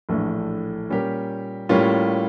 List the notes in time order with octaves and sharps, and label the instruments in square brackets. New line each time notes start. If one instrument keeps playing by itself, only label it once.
[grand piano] A#1 A2 E3 A3 D4
A#2 G3 C#4 G4 A#4
A2 G3 A#3 C#4 F4